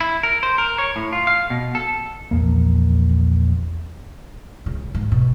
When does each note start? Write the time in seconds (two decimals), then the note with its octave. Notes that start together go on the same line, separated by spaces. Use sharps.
0.01 E4
0.23 A#4
0.43 C5
0.58 A#4
0.78 C#5
0.96 A2
1.13 F4
1.27 F5
1.50 B2
1.75 A4
2.31 A#1 E2 A#3
4.66 C#2
4.95 G#2
5.12 B2